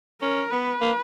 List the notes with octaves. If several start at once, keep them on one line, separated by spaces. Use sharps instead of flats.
C#4 A#4
B3 B4
A#3